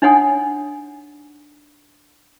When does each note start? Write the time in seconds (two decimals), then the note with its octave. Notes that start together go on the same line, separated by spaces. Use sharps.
0.02 D4 D#4 C#5 F#5 G#5 D#6